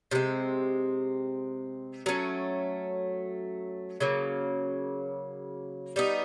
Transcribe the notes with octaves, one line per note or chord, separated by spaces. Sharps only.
C3 F3 G#3 C4
F#3 A3 C#4
C#3 F#3 A#3
G3 B3 D#4